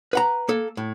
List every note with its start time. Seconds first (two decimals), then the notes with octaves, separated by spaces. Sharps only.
0.13 B4 F#5 A#5
0.49 A#3 A4
0.77 A2